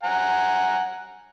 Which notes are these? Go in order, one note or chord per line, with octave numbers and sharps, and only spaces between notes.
F#5 G#5 A#5